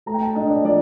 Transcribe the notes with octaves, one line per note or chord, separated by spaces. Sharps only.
A3 A#5
G5
A5
D4 D#5
D#5
D5
F3 D5